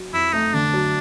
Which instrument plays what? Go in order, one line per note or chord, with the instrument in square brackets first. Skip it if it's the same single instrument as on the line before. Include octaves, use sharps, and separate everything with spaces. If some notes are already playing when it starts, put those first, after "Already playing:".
Already playing: [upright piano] F#3
[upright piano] F2 [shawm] E4
[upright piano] A3 [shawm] D#4
[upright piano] D3 [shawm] D4
[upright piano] F#3